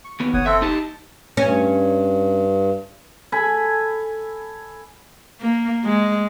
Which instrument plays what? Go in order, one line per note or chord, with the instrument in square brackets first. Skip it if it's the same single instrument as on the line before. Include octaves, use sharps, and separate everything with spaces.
[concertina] C#6
[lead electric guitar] D#2 B3
[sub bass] F#1 [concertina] C#5 F#5 D#6
[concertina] C4 A4 G5 [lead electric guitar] E5
[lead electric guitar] D#4 G4 [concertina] A5
[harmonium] G2 [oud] C#4
[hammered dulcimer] A4 G#5 B5
[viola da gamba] A#3
G#3